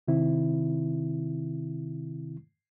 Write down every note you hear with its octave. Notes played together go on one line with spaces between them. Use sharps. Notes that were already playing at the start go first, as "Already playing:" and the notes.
C3 D#3 C4 E4